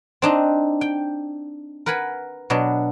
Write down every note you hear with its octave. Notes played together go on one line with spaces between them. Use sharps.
C4 D4 D#4
G5
A#4 B4 F#5 G#5 B5
B2 F#3 D4